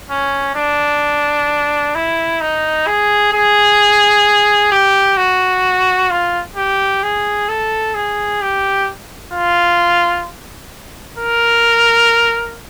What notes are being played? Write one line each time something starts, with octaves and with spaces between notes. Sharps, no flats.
C#4
D4
E4
D#4
G#4
G#4
G4
F#4
F4
G4
G#4
A4
G#4
G4
F4
A#4